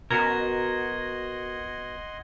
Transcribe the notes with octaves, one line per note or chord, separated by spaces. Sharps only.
B2 F#4 A#4 D#5 F#5 C6 G#6 A#6